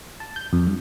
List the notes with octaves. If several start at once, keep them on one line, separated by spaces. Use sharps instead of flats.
A5
G6
F2
G2